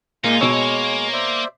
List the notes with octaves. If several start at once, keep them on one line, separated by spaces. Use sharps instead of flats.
A#2 G#3 A#3 D#4 F4 G#5
B2 A#3 C#5 E6
C5 D5 E5